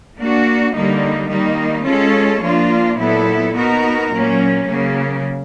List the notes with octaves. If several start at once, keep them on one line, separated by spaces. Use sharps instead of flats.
A#3 D4 F#4
D3 G3 A#3 D#4
D#3 G3 A#3 D#4
G#3 C#4 F4 A4 C#5
F3 A#3 D4 F4
A#2 F#3 B3 E4 A4
B3 D#4 F#4 A#4
A#2 F#3 A#3 C#4
C#3 F#3 A#3